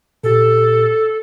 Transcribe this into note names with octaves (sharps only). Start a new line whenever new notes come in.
A#2 G4 A4